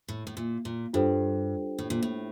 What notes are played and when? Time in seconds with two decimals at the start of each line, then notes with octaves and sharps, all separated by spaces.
0.08 A2
0.27 A2
0.37 A#2
0.65 A#2
0.93 G2 D4 F4 A4 C5 G5
1.79 A2
1.90 A#2
2.03 A2